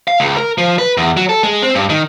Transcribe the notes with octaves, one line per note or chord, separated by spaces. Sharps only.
F5
C#2
A#4
F3
B4
E2
F#3
A4
G#3
C4
G2
D#3